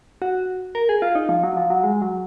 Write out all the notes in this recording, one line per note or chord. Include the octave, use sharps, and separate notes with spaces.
F#4
A#4
G#4
F4
D#4
F3
F#3
F3
F#3
G#3
F#3